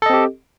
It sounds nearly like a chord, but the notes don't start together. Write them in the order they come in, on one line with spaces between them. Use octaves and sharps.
A4 D#5 C4 G4